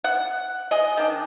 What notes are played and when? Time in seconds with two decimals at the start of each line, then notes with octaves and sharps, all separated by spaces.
0.04 F#5
0.71 G#4 D#5
0.97 D#3 D4